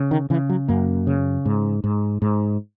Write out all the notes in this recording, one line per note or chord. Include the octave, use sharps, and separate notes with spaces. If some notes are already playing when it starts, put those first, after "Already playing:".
Already playing: C#3
D#3
C#3 E3
F#3
F#2 A#3
C#3
G#2
G#2
G#2